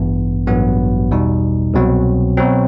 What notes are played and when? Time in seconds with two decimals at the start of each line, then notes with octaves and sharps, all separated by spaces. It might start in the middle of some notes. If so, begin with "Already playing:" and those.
Already playing: A1 G2 E3 B3
0.47 A1 G2 F#3 B3 F#4
1.11 E2 B2 G3 D#4
1.74 C2 B2 F#3 C4
2.37 B2 F#3 C4